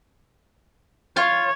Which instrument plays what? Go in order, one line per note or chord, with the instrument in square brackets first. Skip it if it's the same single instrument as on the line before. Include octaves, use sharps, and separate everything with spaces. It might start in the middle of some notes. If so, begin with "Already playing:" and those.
[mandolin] F4 [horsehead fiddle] C#5